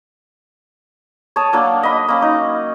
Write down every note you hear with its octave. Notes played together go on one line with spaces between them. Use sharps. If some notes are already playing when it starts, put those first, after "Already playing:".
C#5 A5 D#6
F#3 A#3 D4 F#4
D#5 B5
A#3 C#4
D#4